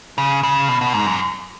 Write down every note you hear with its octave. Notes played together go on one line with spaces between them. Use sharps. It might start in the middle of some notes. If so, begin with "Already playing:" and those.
C#3
C#3
B2
B2
G#2
F#2